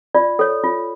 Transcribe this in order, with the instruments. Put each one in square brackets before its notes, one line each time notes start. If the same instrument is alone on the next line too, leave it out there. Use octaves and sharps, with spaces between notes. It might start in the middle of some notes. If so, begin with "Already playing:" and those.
[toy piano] F4 D5
A4 C#5
F4